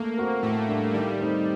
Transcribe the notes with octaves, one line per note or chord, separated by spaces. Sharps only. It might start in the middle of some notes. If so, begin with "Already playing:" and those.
Already playing: A3 A#3
C4 F#4 A#4
A2 A3
G3 A#3 D4
D#3 G3
A3 C4 D#4